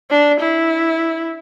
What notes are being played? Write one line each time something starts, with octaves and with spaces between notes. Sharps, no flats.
D4
E4